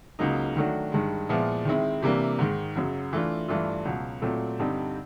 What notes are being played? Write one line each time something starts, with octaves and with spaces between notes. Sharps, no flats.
C#2 C#3 F#3 A#3 D#4
D#3 F#3 A3 D4 F#4
G2 D#3 G#3
A#2 F3 G#3 B3 E4
D#3 G#3 C4 E4
C3 E3 G3 A#3 D4
G#2 D#3 G#3
F#2 C#3 F#3
E3 A3 D4 F4
G2 E3 A3 D4 F4
C#2 B2 F#3
A#2 F#3 A3 C4
G2 D3 G3 C4 D#4